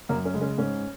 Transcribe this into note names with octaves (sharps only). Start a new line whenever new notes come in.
F#2 A#3
C#4
C#3 G#3
C#4
G#2 C#4